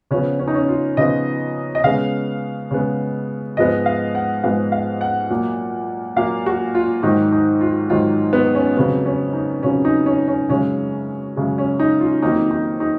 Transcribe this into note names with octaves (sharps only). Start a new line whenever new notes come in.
C#3 F3 B3 C#4
C#4
D#4
C#4
F4
C#3 F3 B3 D#5
D#5
C#3 G#3 B3 F5
C#3 G#3 B3
G#2 F3 G#3 B3 D#5
F5
F#5
G#2 F3 G#3 B3 F5
F5
F#5
A#2 F#3 A#3
A#2 F#3 A#3 F5
F#4
F4
G#2 D#3 F#3 D#4
D#4
F4
G#2 D#3 F#3 F4
B3
C#4
F2 C#3 F#3 B3
C#4
D#4
F2 C#3 F#3 C#4
D#4
C#4
C#4
F#2 C#3 G#3 C#4
F#2 C#3 G#3
C#4
D#4
F4
F2 D#3 F#3 A#3 D#4
D#4
D#4